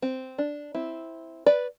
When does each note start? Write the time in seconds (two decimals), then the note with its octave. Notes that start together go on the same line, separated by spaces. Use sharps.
0.02 C4
0.38 D4
0.74 C4 E4
1.46 B4 D5